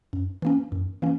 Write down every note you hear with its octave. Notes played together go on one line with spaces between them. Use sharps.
F#2
E3 A#3 C#4
F#2
E3 A#3 C#4